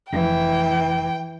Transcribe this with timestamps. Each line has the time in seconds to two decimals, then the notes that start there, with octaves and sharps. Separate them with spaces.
0.12 F1 E3 G5